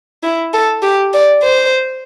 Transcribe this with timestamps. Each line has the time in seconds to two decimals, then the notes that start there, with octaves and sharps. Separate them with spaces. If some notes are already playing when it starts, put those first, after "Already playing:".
0.23 E4
0.54 A4
0.82 G4
1.13 D5
1.43 C5